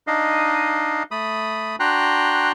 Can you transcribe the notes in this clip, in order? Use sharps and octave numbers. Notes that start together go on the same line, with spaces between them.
D4 D#4 D#5 F5
A3 B5 D#6
D4 F#4 G5 A#5 C6 F#6